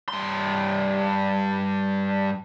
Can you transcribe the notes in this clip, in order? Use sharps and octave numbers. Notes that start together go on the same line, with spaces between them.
G2 C6